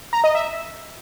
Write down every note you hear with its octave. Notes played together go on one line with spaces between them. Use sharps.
A#5
D#5
E5